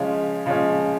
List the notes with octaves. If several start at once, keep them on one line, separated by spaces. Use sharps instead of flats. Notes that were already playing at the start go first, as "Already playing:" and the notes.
Already playing: C#3 F3 G#3 C#4
C#3 F3 G#3 C#4